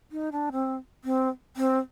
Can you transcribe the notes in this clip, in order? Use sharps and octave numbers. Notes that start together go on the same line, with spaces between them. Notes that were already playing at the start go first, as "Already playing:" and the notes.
D#4
D4
C4
C4
C4